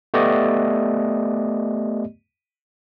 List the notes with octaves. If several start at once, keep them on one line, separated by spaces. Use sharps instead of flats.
A3 B3 G4 D5 D#5